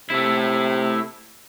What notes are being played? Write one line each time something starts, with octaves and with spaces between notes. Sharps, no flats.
C3 A3 E4